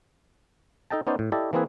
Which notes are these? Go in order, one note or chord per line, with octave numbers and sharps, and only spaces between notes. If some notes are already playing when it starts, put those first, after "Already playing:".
D#4 A4 D#5 G5 A5
B3 C#4 D#4 C5 D5
A2
E4 G4 A4 D5 D#5
E3 A#3 C4 E4 G#4 B4